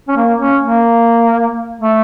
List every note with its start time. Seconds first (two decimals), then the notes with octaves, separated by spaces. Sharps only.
0.09 C#4
0.17 A#3
0.40 C#4
0.64 A#3
1.81 A3